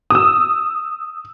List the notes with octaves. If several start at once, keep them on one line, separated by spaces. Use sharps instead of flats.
D#6 E6